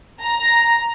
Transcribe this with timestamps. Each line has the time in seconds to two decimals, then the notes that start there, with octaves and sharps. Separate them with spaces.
0.21 A#5